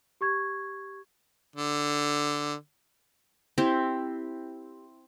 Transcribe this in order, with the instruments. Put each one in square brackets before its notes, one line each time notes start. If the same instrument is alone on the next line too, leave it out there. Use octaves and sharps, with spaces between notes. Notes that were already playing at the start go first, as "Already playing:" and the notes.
[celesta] G4 C#6 G#6
[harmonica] D3
[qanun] C4 E4 G4